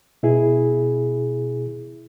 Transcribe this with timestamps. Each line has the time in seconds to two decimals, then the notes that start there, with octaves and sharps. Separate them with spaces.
0.23 B2 E4 G#4